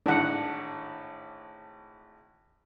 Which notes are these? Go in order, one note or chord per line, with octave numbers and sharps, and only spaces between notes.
G#1 A2 D4 F#5